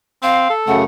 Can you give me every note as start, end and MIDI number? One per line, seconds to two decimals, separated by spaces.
0.23 0.50 60
0.23 0.52 77
0.50 0.76 69
0.67 0.84 42
0.67 0.84 49
0.67 0.84 57
0.67 0.83 78